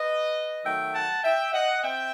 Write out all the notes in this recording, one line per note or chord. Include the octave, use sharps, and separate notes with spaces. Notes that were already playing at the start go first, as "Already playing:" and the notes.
Already playing: B4 D#5
D#3 F#3 A3 E5 G5
F#5 A5
E5 G5
D#5 F#5
C4 E5 G5